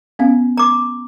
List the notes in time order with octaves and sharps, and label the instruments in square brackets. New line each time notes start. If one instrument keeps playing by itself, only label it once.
[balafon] B3 C#4 F5
[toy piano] A#5 D6